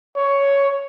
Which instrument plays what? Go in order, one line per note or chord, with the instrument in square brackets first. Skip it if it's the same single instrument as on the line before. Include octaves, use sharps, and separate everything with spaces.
[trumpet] C#5